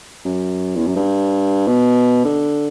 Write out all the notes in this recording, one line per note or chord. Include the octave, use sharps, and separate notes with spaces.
F#2
E2
F#2
G2
B2
D3